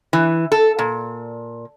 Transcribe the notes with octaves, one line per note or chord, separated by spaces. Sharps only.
E3
A4
A#2